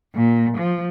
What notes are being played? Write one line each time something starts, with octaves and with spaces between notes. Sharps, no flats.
A#2
F3